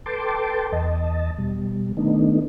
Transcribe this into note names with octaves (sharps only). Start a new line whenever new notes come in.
A4 B4 G5 A5 C6 D6
E2 D#5 A5
B2 G3
D#3 A3 B3 D4 D#4